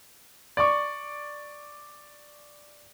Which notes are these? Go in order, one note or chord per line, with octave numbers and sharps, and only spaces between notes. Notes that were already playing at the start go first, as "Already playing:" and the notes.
D5 C#6